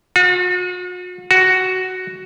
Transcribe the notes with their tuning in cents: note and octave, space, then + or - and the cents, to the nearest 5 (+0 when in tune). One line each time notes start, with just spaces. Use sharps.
F#4 -40
F#4 +10